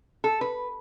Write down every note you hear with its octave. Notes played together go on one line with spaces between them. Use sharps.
A4
B4